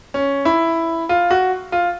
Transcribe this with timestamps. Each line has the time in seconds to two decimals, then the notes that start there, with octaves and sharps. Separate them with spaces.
0.14 C#4
0.45 E4
1.09 F4
1.31 F#4
1.72 F4